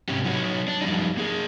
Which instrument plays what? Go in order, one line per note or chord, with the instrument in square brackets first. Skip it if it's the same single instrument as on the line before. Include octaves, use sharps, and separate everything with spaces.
[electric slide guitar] G#2 C3 C#4 G4
F#3 D#4 F#4 A#4 C#5
D4
F#2 F3 G3 D#4
A#3 G#4